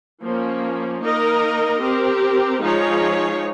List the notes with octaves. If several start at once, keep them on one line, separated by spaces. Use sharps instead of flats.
F3 A#3 C#4
A#3 D#4 A#4 D#5
C4 G4 A#4
F3 G#3 D#4 G#4 C#5